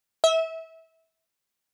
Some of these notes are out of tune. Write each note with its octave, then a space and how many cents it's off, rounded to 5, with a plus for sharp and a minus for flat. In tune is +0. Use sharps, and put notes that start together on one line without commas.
E5 -25